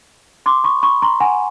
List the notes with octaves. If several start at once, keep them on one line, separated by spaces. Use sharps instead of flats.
C6 D6
B5 C#6
B5 C#6
A#5 C6
F#5 G#5